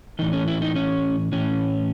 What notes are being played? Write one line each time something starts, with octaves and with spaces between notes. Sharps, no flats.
A2 E3 D#4
C#4
E4
D#4
C#4
A2 E3 C#4